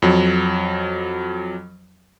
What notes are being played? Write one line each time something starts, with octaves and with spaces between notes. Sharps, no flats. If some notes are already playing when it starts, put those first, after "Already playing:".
F2 F#3